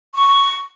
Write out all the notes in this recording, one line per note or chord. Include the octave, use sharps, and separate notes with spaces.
C#6